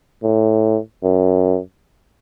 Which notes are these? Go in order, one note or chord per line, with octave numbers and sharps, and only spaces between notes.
A2
F#2